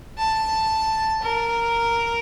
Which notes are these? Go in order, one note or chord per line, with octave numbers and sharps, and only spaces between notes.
A5
A#4